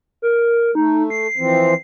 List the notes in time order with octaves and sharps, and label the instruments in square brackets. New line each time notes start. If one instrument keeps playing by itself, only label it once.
[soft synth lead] A#4
[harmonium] A3 [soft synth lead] D#4
[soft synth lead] C7
[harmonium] E3 F3 C4